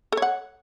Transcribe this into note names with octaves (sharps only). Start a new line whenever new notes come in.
A4 C#5 F#5